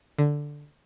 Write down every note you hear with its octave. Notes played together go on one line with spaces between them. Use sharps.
D3